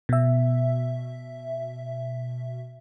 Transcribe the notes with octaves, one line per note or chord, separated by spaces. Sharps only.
B2 E5